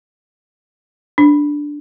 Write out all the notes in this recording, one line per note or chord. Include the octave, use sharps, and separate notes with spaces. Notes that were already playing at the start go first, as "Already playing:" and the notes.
D4